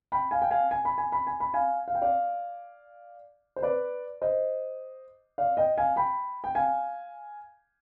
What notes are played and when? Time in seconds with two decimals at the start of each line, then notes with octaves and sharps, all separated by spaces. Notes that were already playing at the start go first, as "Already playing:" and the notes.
0.12 G5 B5
0.31 F5 G#5
0.42 G5
0.51 F5 G#5
0.71 G#5
0.85 B5
0.98 G#5
1.12 B5
1.27 G#5
1.40 B5
1.54 F5 G#5
1.88 F5
1.95 G5
2.02 D5 F5
3.56 C5
3.62 B4 D5
4.22 C5 D#5
5.38 D5 F5
5.57 D#5 G5
5.78 F5 G#5
5.96 G5 B5
6.44 G5
6.55 F5 G#5